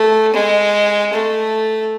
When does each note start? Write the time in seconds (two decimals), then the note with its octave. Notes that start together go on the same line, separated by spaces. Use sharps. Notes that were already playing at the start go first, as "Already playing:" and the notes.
Already playing: A3
0.33 G#3
1.13 A3